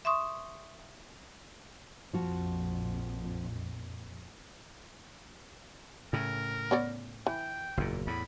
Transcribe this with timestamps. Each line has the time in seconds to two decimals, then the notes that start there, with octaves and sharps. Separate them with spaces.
0.05 E5 C6 C#6 D#6
2.13 A#1 F2 A#2 F3 F#4
6.13 A2 C#3 A#4
6.71 B3 C#5 D5
7.27 E3 G5
7.77 F#1 E2 A#2
8.07 E2 A2 B5